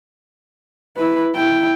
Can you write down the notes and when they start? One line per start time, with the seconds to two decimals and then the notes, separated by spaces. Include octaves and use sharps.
0.97 E4 B4
1.35 E4 G5